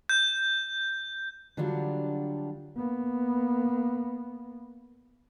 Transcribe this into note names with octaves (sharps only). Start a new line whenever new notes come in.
G6
D3 F#3 G3 D4 F4
A#3 B3